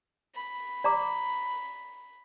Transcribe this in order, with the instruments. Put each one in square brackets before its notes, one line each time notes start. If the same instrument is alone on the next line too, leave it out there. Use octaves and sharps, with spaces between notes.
[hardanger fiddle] B5
[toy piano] D5 A#5 D6